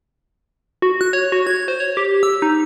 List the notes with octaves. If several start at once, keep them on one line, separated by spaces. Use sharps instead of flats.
F#4
F#6
C#5
F#4
G#6
C5
C#5
G4
E6
D#4